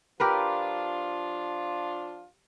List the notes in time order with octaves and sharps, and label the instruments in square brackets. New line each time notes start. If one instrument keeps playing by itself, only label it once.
[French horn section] F3 D4 F4 [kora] G4 A#4 B4